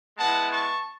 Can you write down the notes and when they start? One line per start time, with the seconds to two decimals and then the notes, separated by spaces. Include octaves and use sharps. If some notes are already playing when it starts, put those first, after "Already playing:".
0.18 G#3 B3 E4 F#5 A5
0.51 A5 C#6